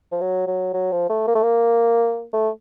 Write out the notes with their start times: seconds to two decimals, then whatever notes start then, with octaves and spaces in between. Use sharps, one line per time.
0.12 F3
0.21 F#3
0.47 F#3
0.74 F#3
0.92 F3
1.09 A3
1.27 A#3
1.35 A3
1.43 A#3
2.33 A3